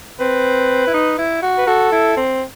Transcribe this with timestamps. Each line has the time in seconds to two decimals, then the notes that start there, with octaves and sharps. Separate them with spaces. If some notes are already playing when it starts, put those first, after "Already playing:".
0.20 C4 B4
0.87 E4
0.94 D#4
1.18 E4
1.42 F#4
1.58 B4
1.67 F#4 A4
1.92 E4
2.17 C4